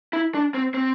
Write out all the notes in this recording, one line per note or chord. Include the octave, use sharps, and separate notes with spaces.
E4
D4
C4
C4